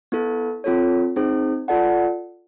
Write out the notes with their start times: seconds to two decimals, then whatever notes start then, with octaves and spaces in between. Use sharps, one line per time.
0.12 B3 E4 A4
0.64 C4 F4 A4 C#5
1.16 C4 D#4 G#4 C5
1.68 F4 A4 D5 F#5 A5